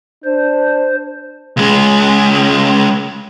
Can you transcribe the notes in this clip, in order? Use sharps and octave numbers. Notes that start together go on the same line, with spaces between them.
D4 C5
C#2 G#3